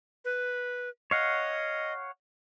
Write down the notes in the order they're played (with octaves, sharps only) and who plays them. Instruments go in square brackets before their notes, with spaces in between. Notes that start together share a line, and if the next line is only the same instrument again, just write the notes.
[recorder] B4
[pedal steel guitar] C#5 F5 F#5 [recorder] D#5